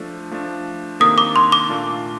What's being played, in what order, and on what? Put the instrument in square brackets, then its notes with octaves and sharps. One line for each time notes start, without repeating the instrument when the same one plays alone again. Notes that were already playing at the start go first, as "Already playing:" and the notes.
Already playing: [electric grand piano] F3 A3 D4 A4
F3 A3 D4
[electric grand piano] C3 D#3 A#3 D4 A4 [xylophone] D#6
[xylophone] D6
C6
D6
[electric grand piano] A#2 A3 D4 F4